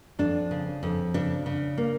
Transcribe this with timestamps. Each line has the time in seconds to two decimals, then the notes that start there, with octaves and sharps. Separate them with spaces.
0.19 F2 D4
0.51 C#3
0.83 F2
1.14 C#3 D4
1.46 C#3
1.78 A#3